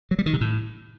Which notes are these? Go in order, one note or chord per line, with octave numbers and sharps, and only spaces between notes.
F#3
G3
D#3
C3
A2